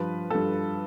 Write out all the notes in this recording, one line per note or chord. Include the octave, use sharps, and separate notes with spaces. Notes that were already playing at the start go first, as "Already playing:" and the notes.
Already playing: G2 F3 B4
G2 F3 A4